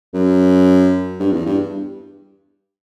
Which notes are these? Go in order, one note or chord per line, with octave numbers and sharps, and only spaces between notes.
F#2
G2
E2
G2